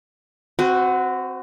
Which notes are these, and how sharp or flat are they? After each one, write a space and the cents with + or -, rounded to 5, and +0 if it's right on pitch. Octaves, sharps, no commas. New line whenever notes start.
C4 +0 F#4 +0 B4 +45